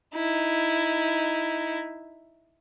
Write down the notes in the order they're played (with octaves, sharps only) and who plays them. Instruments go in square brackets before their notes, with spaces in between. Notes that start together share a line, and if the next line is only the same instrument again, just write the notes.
[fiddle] D#4 E4